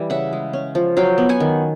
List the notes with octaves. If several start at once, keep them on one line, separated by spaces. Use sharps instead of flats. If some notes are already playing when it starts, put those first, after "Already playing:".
Already playing: E3 G3
C#3 E5 F#5
G#3
C#4
F3
F#3 F5 G5
B3
F#5 G#5
D#3